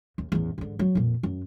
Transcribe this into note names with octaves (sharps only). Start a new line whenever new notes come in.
D#2
A1 E2
G#2 D3
F#3
F2 A#2
F#2